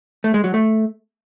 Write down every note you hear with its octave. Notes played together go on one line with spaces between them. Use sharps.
A3
G#3
F#3
A3